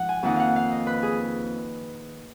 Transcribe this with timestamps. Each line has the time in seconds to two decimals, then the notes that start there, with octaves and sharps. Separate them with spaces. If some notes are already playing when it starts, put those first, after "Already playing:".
Already playing: G#2 F3 F#5
0.09 G#5
0.23 F2 D#3 A#3 D#4 F#5
0.36 F5 F#5
0.56 F5
0.71 D#5
0.87 B4
1.03 G#4